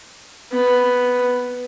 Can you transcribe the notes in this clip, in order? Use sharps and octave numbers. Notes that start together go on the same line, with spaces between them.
B3